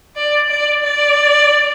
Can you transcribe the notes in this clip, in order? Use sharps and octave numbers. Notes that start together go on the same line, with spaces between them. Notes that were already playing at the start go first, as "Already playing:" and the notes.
D5
D5
D5